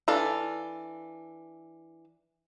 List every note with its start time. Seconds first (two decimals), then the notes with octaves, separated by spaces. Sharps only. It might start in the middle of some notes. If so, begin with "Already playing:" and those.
0.08 E3 D4 A4 F5